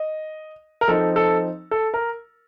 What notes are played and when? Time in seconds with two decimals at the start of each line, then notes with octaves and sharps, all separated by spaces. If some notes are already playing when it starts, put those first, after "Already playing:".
Already playing: D#5
0.81 A#4
0.88 F3 C4 D#4 A4
1.16 A4
1.71 A4
1.94 A#4